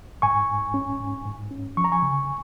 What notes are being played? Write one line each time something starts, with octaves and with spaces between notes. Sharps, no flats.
G#2 G#5 C#6
G#2
C#4
G#2
G#2
C#4
F3 C#6
A#5
G#5 C#6
C#3